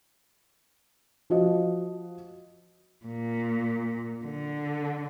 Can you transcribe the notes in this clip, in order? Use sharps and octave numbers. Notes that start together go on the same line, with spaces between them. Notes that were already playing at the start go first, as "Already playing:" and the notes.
F3 F#4 D#5
A#2
D3